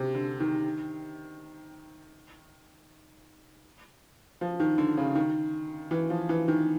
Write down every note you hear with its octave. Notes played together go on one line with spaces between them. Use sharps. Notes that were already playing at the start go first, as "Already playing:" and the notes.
Already playing: C3
D3
D#3
F3
D#3
D3
C#3
D#3
E3
F3
E3
D#3